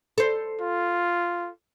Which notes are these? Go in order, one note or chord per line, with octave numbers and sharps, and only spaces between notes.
A4 C5
F4